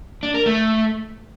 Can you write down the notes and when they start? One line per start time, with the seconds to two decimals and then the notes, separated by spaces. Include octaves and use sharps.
0.23 D4
0.34 A#4
0.46 A3